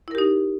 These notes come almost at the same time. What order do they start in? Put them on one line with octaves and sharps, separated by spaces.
E4 A#4 G4 D#4